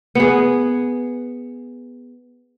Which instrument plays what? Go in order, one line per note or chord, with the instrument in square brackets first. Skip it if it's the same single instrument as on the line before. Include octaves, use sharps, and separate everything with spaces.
[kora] B3 G#4